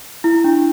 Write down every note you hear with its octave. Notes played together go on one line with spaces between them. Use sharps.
E4
D4